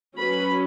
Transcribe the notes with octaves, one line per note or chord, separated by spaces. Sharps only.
F#3 C#4 B4 B5